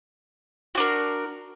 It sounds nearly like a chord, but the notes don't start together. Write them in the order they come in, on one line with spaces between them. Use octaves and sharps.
F#4 D4 A#4